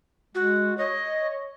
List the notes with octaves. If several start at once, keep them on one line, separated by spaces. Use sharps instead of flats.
G#3 F#4
C#5 D#5